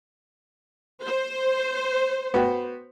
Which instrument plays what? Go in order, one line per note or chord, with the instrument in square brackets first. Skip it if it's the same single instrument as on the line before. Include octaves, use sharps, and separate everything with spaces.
[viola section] C5
[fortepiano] B3 F#4 G5